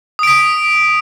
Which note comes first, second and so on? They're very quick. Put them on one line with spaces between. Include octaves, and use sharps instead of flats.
D#6 D7 B6